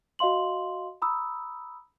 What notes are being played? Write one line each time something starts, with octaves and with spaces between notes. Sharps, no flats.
F#4 D#5 F5 C6 F#7
A#5 B5 D#6 E6